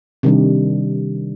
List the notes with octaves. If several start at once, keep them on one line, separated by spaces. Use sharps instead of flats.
C3 D#3 G3 D4